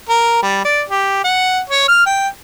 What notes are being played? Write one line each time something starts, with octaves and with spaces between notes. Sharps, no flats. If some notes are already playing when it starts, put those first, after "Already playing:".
A#4
G3
D5
G4
F#5
C#5
F6
G5